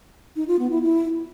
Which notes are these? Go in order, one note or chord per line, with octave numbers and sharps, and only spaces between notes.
D#4
F4
B3
E4
E4